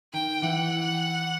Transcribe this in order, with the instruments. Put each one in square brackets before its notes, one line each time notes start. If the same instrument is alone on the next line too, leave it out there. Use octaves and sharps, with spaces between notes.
[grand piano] D#3 [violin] G5
[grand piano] E3 [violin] F#5